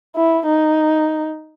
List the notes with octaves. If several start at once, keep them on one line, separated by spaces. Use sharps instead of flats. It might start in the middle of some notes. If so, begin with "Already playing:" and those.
E4
D#4